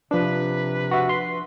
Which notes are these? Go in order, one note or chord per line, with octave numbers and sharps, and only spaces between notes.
C3 F3 D4 B4
F#4 E5
C6